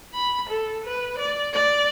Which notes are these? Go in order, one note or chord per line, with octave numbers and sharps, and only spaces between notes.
B5
A4
B4
D5
D5